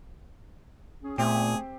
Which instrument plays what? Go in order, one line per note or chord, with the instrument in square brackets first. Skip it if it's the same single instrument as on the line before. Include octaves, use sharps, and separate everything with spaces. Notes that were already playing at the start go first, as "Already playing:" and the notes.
[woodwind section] C#4 G#4
[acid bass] A#2 [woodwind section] A3 B3 [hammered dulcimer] C4 G4 [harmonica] G#4